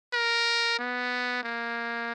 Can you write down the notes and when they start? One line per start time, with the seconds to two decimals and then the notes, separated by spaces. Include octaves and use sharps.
0.14 A#4
0.79 B3
1.43 A#3